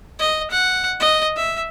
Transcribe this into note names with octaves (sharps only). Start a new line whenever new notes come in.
D#5
F#5
D#5
E5